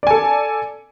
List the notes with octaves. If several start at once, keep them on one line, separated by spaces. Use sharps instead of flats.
A4 D5 G#5